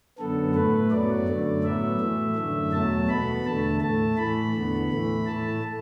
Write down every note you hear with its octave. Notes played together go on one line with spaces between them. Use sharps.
F#2 D3 B3 A4
A2 A3 B4
F#2 F#3 B3 D5
F#2 D3 A3
A2 F#3 B3 E5
A2 E3 A3
F#2 D3 A3
E2 B2 F#3 A3 A5
B2 B3 B5
E2 D3 A3 A5
A2 A3 A5
A2 E3 A3 B5
E2 D3 B3
A2 E3 A3
A2 A3 A5